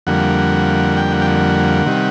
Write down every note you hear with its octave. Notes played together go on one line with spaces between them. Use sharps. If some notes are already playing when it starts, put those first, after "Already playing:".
F2 D3 G3 A#3 F#5
G5
F#5
G5
F#5
C3 D#3 G3